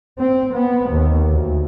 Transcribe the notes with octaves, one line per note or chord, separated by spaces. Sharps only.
C4
B3
D#2
D2